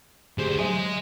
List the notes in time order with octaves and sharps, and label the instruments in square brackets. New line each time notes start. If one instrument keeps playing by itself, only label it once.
[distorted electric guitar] D2 C5 [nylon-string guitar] G4 G#4
[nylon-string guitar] F#3 E5 A5 [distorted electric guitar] D#5 G#5